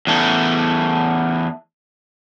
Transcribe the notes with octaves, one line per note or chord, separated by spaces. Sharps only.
E2 A3